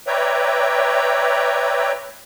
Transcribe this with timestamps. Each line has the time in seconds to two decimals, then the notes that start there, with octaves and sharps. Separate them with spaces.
0.07 B4 C#5 D5 E5 G5 A#5